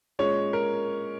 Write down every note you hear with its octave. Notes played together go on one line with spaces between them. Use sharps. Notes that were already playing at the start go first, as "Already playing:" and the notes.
A#2 G#3 C#4 C#5
A#4